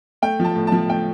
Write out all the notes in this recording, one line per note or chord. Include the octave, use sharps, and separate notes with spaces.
A3 G5
F3 A5
A2
F3 A5
A3 G5